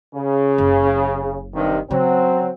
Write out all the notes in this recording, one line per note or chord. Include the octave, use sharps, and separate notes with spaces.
C#3
F#1
G2 C3 D#3
C#3 F#3 C4